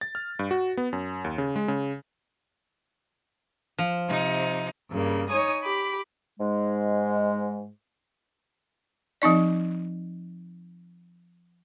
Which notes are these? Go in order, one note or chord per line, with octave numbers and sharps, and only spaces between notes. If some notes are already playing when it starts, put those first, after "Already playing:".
A6
F6
G2
F#4
B3
F#2
D#2
C#3
G#3
C#3
F3
C3 D#4
G2 C#3 A#3
D#4 C#5 G#5 D#6
G4 B5 D6
G#2 G#3
F3 C4 D#4 D5